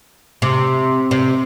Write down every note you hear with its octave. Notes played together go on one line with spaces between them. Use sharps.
C3
C3